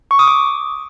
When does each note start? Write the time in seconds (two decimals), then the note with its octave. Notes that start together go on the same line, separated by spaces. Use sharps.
0.11 C#6
0.19 D#6
0.27 D6